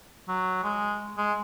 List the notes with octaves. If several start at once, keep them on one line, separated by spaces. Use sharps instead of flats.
F#3
G#3
G#3